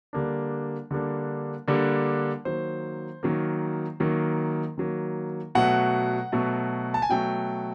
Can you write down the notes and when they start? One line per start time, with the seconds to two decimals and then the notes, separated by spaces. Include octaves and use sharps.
0.13 D3 G3 A#3 D4
0.91 D3 G3 A#3 D4
1.68 D3 G3 A#3 D4
2.45 D#3 F#3 A#3 C5
3.23 D#3 F#3 A#3
4.00 D#3 F#3 A#3
4.78 D#3 F#3 A#3
5.55 B2 F#3 A3 F#5
6.32 B2 F#3 A3
6.94 A5
7.02 G#5
7.10 B2 F#3 A3 G5